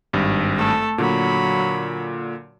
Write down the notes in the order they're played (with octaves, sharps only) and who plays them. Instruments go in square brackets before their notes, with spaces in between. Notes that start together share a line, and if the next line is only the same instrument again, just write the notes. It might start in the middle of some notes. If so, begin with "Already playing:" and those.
[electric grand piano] G#1 G2
[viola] A3 A4
[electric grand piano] A#2 D3 [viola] F#3 B5